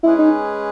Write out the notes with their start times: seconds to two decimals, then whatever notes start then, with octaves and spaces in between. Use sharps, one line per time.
0.03 G#3 C#4 E4 G#4 B4
0.19 D#4